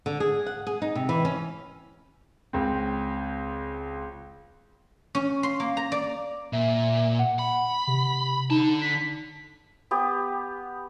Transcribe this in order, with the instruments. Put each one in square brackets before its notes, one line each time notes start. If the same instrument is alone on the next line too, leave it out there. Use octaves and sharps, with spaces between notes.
[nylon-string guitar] D3
G#4
F#5
G#4
D#4
C3
E3
C#4
[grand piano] C#2 C4
[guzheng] C#4
C6
A#3
A#5
D5
[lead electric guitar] A#2 [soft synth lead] E5
[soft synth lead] F#5
[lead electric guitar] B5
[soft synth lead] C3
[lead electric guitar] D3 A5 [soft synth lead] D#4
[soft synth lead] B6
[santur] B3 G4